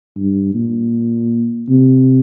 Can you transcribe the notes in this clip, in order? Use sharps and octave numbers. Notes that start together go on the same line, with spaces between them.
G2
A#2
C3